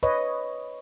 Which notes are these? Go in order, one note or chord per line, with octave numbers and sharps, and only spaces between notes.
B4 C#5 D#5